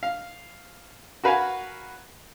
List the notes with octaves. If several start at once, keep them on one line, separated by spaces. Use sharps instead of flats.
F5
F#4 A#4 B4 F5 F#5 G#5